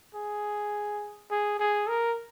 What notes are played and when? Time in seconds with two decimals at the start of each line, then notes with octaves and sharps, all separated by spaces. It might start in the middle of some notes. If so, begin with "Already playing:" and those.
0.15 G#4
1.31 G#4
1.60 G#4
1.88 A#4